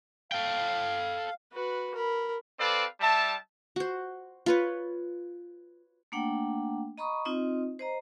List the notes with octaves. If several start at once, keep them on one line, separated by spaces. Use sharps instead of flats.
A4 F5 G5
F#4 B4
A#4 B5
C4 A4 B4 D5 F5
G3 E5 A5
F#4 C5
F4 B4 C#5
A3 A#3 D4 F#5 G5
D#5 A#5 B5 C#6 D#6
C4 D#4 F4 D#5
C5 D#5 A#5